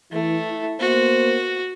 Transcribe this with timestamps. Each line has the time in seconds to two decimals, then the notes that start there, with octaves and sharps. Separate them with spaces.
0.12 E3 A3 E4
0.50 E4
0.80 A#3 B3 F#4 C5